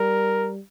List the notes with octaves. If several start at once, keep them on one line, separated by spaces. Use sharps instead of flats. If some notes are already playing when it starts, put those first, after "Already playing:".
Already playing: G3 A#4